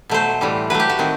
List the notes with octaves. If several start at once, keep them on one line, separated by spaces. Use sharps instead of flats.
B2 F#3 A3 C5
A2 E3 G3
A2 F#3 A3 B4
G4
F#4
D#3 C4